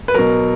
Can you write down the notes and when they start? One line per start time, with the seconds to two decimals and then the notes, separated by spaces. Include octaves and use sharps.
0.08 B4
0.14 B2 F#3 A#4